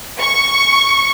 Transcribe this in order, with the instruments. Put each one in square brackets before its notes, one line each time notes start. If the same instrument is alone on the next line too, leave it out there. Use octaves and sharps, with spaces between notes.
[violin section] C#6